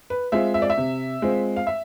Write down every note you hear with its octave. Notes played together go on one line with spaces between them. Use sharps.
B4
G#3 C4 F4 E5
E5
D5
E5
C3
G#3 C4 F4
F5
E5